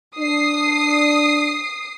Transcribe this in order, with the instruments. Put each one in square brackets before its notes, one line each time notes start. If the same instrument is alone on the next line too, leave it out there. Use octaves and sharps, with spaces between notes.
[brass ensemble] D4 [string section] D#6 C7